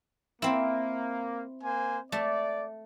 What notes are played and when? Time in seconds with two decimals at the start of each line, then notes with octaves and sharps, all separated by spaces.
0.42 A#3 C4 E4
1.63 A#3 C5 G#5
2.12 A3 D5